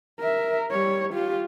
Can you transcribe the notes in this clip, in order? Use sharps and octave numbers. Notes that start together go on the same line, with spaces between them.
A#4 E5
G3 C#5
F4 G4